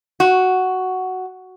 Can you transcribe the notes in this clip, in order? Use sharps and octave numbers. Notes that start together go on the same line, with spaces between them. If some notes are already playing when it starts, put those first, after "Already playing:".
F#4